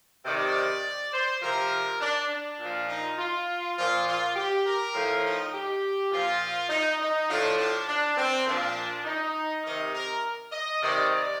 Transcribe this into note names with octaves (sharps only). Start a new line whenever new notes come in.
C3 D#3 D5
C5
C3 F3 A#4
D4
D4
A#2 F3
D#4
F4
A#2 F3 F4
F4
G4
A#4
A2 F3
D#4
G4
A#2 F3 F4
D#4
D#4
A2 F3 D4
D4
D4
C4
A#2 F3 D4
D#4
C3 D#3 D#4
A#4
D#5
C3 D#3 D5
D5